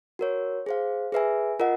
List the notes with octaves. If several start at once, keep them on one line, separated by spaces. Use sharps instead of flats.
F#4 A#4 C#5
G#4 C5 F5
G#4 B4 E5 G#5
F4 A#4 D#5 F#5